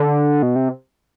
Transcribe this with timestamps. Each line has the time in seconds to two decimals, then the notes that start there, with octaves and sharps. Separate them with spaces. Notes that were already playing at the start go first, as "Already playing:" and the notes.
Already playing: D3
0.43 B2
0.56 C3